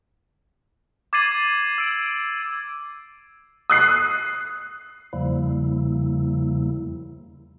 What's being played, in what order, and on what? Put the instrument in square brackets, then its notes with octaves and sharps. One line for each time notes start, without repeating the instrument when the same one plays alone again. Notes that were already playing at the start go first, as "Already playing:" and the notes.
[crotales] D6 G#6 A6 C7 D#7 F#7
E6 D7
[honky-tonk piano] D#6 F#6 C7
[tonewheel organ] E2 C#3 F3 G3 A#3 E4